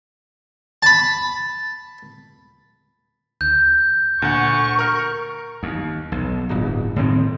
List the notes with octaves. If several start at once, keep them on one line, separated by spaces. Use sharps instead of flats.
A5 B5
D2 G6
D2 A#2 F#5 C#6
A#4 F6
D#2
B1
D1 G1
A2 D#3 C4